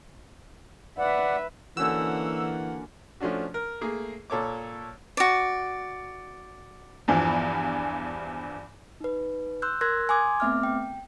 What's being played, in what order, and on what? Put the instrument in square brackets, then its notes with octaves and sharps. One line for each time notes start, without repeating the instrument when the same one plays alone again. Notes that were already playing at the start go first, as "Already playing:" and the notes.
[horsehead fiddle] B4 E5 [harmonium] D5 F#5
[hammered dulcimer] D3 C#4 F#4 [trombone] E3 [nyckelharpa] A#3 F#5 [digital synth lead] E6
[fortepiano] F3 A3 C#4 D4 F#4
A#4
A3 A#3 G#4
A#2 A4 C#5 D6
[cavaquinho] F#4 D5
[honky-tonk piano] E2 G2 E3 F3
[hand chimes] D#4 B4
C6 E6 F#6 G6
A#4 C6 E6 F#6 G#6 A#6
G#5 C6 D6 D#6 G#6
A3 B3 C4 E5 D6 F6
G5